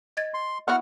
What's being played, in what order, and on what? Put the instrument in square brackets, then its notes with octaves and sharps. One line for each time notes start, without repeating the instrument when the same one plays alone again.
[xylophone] D#5 G#6 A6
[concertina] C6
[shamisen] B3 E4 F#4 [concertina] F#5 F6